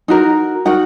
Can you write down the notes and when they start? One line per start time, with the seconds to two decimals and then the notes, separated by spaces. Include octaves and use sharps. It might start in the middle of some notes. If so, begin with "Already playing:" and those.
0.08 D#4 F#4 A#4
0.65 D#4 F#4 A#4 F#5